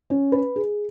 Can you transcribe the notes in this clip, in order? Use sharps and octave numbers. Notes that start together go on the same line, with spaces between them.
C#4
B4
G#4